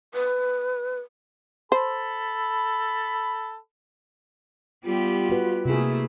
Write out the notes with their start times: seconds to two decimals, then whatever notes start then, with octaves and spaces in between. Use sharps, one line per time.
0.14 B4
1.72 A4 C5 B5
4.85 G3 B3 F4 G4
5.30 F#4 B4
5.65 C3 A3 A#3 E4 G#4